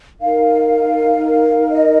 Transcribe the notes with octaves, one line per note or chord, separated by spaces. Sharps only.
D#4 A#4 F5
D#5